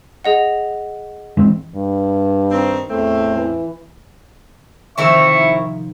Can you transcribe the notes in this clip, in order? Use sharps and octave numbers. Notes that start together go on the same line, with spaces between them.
G#4 D#5 F#5
E3 G#3 C4
G2
D#3 C4
E2 A2 A3 C4
E3
C3 D#3 F3 C4 E4 A#4 E5 C#6